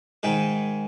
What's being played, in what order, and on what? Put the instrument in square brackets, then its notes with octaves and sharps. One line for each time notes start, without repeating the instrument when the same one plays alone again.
[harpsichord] G#2 D#3 G#3